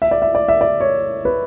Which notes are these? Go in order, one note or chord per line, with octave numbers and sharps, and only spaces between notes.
E5
D5
E5
D5
E5
D5
C#5
B4